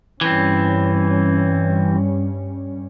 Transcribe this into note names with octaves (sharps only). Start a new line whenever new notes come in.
G2 E3 G3 C4 C#4